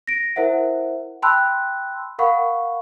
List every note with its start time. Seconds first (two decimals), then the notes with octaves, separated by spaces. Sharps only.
0.07 A#6 D7
0.36 E4 A#4 C5 E5 F#5
1.22 G5 A5 B5 C6 E6 F#6
2.19 A#4 F5 F#5 B5 C#6